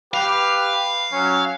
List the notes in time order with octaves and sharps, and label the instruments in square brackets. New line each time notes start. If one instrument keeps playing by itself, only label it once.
[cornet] G4 [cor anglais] B4 [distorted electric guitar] F5
[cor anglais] F#3 [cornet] C#4